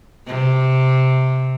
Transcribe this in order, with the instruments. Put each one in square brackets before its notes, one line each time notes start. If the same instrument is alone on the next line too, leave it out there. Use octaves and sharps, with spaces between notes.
[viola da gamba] C3